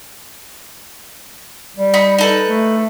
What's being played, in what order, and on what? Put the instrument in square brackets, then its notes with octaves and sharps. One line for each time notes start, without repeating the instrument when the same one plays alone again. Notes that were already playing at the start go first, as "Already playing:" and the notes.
[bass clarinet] G3
[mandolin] D#4 B5
D#4 A4 B4
[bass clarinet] A3